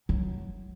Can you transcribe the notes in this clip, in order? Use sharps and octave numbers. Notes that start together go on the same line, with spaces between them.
F#3